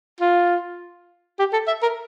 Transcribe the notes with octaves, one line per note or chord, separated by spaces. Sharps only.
F4
G4
A4
E5
A#4